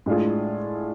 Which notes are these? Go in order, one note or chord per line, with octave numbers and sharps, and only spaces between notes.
A2 G#3 D4 F4 G#4